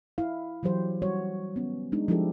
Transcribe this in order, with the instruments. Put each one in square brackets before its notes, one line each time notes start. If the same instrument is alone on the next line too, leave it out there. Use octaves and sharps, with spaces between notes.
[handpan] E4 F5
E3 F#3 G4 C5
G3 F#4 C#5
B3 C#4
G#3 D4 D#4
F3 G#3 D4 E4 G4 A4